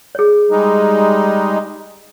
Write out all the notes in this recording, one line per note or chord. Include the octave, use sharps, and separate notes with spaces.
G#4 C#5
G3 G#3 D#4